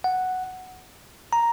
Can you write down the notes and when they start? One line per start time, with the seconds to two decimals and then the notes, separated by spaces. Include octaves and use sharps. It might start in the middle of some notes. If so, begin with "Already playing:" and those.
0.04 F#5
1.33 A#5